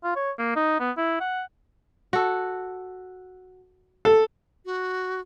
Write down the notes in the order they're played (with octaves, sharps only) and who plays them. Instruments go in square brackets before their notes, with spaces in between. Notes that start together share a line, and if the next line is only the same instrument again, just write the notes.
[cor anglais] F4
C#5
A#3
D#4
B3
E4
F#5
[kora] F#4 A4
[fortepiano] A4
[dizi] F#4